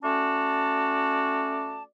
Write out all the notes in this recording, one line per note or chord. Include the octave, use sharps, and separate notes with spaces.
A3 C#4 F#4 D5 A5